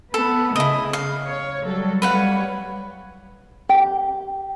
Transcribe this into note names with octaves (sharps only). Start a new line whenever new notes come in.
B3 A4
C#3 E4 D#5
F5
C#5
F#3 G3 A4
G3 B4 C#5 F5 F#5
G4